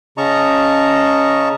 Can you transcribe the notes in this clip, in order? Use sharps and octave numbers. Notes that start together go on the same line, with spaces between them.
C#3 C#4 D#5 A5 A#5 C#6